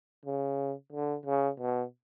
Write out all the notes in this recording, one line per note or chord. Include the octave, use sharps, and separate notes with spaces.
C#3
D3
C#3
B2